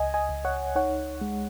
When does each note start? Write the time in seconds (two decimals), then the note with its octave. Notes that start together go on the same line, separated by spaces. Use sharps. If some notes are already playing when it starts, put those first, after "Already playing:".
Already playing: C#2 D#5 G#5
0.14 D#5 G#5
0.29 C#2
0.45 C#5 F#5
0.76 D#4 C#5 F#5
1.21 G#3